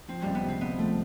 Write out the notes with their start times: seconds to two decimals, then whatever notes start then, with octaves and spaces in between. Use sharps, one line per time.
0.08 F3 C4
0.22 C#2 G3
0.35 B3
0.43 C3
0.48 C4
0.61 C#2 B3
0.78 F3 A3